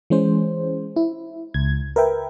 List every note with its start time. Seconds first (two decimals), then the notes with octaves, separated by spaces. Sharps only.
0.10 E3 G#3 C#4 C5
0.96 E4
1.54 C#2 G#6
1.96 A#4 B4 E5 G5